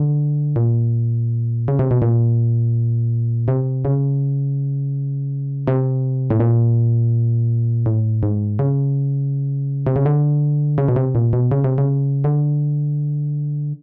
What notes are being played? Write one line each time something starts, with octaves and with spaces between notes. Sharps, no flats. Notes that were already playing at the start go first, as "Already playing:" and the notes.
Already playing: D3
A#2
C#3
C3
B2
A#2
C3
C#3
C3
A2
A#2
A2
G#2
C#3
C3
C#3
D3
C#3
B2
C3
A#2
B2
C#3
C3
C#3
D3